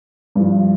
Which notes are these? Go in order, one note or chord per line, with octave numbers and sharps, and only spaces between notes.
G2 F3